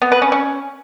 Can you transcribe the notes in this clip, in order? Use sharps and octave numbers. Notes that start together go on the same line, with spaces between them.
B3
B4
C#4
C#4